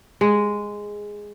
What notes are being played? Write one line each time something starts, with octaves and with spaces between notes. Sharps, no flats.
G#3